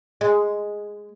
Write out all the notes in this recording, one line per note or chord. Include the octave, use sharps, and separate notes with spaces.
G#3